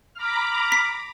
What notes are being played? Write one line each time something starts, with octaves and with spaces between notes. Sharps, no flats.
A#5 B5 D6 F6
B6